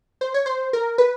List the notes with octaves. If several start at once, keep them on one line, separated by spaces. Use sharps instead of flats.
C5
C#5
C5
A#4
B4